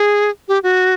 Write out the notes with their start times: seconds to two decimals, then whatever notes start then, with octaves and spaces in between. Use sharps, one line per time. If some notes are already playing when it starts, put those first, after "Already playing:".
Already playing: G#4
0.48 G4
0.63 F#4